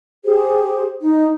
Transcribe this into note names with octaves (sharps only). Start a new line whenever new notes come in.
G4 G#4 C5
D#4